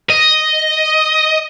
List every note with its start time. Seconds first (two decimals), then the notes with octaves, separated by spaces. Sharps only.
0.10 D#5